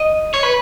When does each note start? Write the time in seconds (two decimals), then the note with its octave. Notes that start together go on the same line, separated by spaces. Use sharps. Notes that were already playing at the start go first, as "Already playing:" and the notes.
Already playing: D#5
0.34 C#5
0.43 B4